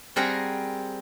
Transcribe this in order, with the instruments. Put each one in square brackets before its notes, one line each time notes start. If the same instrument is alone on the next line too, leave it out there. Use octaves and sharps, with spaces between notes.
[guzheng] G3 C4 G#4 A#4 F#5 A#5